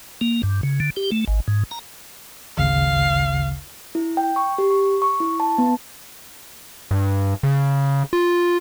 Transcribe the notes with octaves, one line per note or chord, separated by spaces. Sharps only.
A#3
G2
C#3
D3
G4
A3
G#1
G#2
A#5
G#1 D2 C#3 F5
E4
G5
C#6
G4
C#6
C#6
E4
A5
B3
G2
C#3
F4